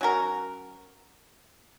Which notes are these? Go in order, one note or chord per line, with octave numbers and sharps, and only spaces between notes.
F#3 C#4 F#4 A#4